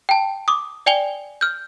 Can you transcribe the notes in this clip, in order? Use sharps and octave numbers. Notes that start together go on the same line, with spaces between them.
G5 A5
D6 D#6
D5 G5 G#5 F7 G7
F6 G6